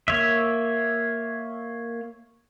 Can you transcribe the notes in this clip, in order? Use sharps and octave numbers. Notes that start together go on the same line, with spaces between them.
A#3 C#5 E5